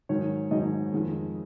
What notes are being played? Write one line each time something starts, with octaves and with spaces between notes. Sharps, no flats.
G#2 D#3 F#3 C#5
G#2 D#3 F#3 D#5
F2 D#3 G#3